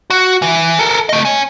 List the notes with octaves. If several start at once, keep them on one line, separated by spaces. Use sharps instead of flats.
F#4
E3
A4 A#4
A3 D#5
C#5 G#5